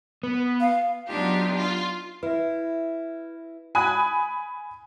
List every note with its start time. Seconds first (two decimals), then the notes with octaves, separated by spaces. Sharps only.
0.23 B3
0.61 F5
1.07 F#3 B3 D4 D#4 F4 G4
1.56 F4
2.23 E4 B4 E5
3.75 G#5 B5 D#6 F#6